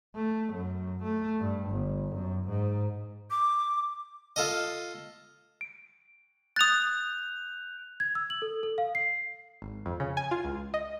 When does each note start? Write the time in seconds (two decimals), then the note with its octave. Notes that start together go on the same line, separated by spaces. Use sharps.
0.15 A3
0.54 F#2
1.04 A3
1.40 G2
1.70 G1
2.16 F#2
2.48 G#2
3.30 D6
4.36 F4 A4 D#5
5.61 D7
6.56 D#6 F#6 G6 A6 F7
8.00 G#6
8.15 E6
8.30 F#7
8.42 A4
8.63 A4
8.78 F5
8.95 C7
9.62 G#1
9.86 F2
10.00 C#3
10.17 G#5
10.31 F4
10.45 C#2
10.74 D#5